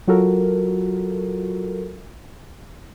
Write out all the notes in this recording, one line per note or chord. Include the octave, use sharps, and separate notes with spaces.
F#3 F4 F#4 A4 A#4